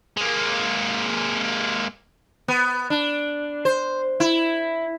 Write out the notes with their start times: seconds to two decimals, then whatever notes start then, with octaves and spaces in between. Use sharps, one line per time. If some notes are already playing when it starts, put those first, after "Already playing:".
0.17 G#3 A#3
2.48 B3
2.90 D4
3.65 C5
4.20 E4